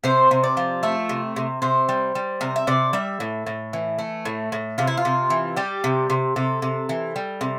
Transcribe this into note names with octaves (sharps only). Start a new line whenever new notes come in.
C3 C5
C3
D5
F3
A3 E5
C3
C3
C3 C5
G3
G3
C3 A#4
E5
C3 D5
G3 E5
A2
A2
E3
A3
A2
A2
C3 F4
E4
F4
C3
E3
G3 G4
C3
C3
C3 A4
C3
E3
G3
C3